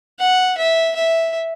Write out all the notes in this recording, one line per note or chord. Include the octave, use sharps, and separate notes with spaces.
F#5
E5
E5